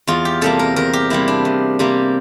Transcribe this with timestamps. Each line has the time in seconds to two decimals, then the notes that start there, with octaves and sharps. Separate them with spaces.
0.07 E2 F4
0.25 G4
0.41 C3 G3 A#3 A4
0.59 A#4
0.76 E2 A#4
0.93 G4
1.10 C3 G3 A#3 E4
1.28 D4
1.45 E2
1.79 C3 G3 A#3